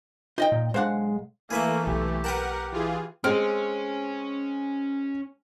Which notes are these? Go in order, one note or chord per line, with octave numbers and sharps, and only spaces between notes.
D#4 F4 D#5 G5
A#2
B1 G#3 D4 C5 F5 F#5
E3 A3 A#3 G#4 B4 E5
B1 G4
A#4 B4 F#5 G5 A5
E3 F4 G#4
G#3 C4 C#4 F6